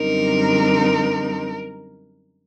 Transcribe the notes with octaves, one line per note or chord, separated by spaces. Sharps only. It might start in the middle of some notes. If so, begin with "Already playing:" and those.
Already playing: F#2 D3 G3 C4 D#4 A#4